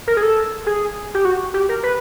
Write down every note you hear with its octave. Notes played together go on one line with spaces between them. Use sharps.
A#4
G#4
A4
G#4
G4
F#4
G4
A#4
B4